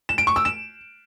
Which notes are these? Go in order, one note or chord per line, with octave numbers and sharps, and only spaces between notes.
E7
D7
C#6
E6
E7